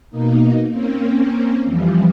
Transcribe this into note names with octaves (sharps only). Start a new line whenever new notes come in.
B2 A#3 D#4
A#3 C4 C#4
F2 E3 F3 G3